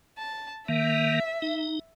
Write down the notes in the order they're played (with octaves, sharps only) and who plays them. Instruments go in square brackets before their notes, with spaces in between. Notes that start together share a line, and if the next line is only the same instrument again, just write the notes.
[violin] A5
[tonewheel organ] D#3 A#3 [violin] E5
[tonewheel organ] D#4